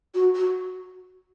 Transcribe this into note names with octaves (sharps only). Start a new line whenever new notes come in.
F#4
F#4